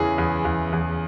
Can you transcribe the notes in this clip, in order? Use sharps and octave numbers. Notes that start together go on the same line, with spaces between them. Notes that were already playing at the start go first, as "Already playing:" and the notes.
Already playing: E2 C#3 E3 G#4 B4
E2
E2
E2